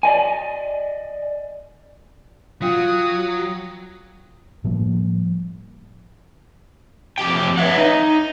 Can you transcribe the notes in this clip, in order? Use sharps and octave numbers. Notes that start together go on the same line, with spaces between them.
D5 D#5 G#5
F#3 F4 G5 D#6
A2 F3 G3 A#3
F2 G4 G5
B4 C#5 E5 F#5
D#4